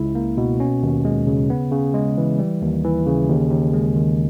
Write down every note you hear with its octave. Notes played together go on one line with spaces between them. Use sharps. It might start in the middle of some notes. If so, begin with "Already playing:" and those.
Already playing: C#2 E4
A#3
B2
C#4
D#2
G#3
C#3
B3
C#3
G#3
E3
G3
D#2
E3
C#3
D#2
D#2
G#3
D#3